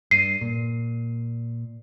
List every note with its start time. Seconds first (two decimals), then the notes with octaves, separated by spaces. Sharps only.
0.11 G2 C7 D#7
0.41 A#2